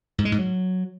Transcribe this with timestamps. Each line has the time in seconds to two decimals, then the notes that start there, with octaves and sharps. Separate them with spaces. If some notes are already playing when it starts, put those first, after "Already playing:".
0.18 G#2
0.25 G#3
0.32 G#2
0.39 F#3